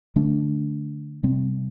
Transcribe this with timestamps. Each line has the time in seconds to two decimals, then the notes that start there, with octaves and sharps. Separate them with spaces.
0.16 D3 A3 D4
1.23 C3 G3 C4